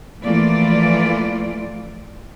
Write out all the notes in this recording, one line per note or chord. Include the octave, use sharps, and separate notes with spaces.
E3 F3 A3 A#3 F4 D5